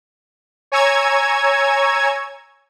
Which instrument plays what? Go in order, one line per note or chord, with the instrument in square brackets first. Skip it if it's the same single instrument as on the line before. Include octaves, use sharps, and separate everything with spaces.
[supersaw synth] C#5 G#5 A#5 C#6 E6 G#6